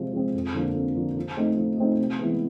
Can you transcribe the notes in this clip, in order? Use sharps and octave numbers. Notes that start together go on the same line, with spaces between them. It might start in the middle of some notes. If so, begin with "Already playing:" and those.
Already playing: C3 F3 G#3 C4
F3 G#3 C4
F2
D3 F3 A#3
F2
D3 F3 A#3
F3
A3 C4 D#4
F3
A3 C4 D#4
C3
E3 G#3 B3